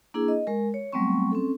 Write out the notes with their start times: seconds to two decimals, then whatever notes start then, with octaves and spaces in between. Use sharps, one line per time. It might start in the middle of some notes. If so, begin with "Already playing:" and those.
0.14 A#3 D4 E4 G#4
0.28 D#5
0.47 G#3 A#4
0.74 C#5
0.92 F#3 G3 A3 B3 C4 C#6
1.32 C4 C#4 A4